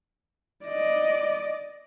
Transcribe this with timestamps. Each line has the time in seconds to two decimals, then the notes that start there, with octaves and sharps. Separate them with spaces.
0.65 D5 D#5